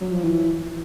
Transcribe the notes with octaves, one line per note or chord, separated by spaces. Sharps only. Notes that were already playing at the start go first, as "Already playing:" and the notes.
F#3
F3
E3